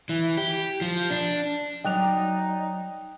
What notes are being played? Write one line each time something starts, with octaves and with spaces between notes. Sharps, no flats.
E3
G4
F3
D4
F#3 D#4 D5 D#5 G5 F#6 F7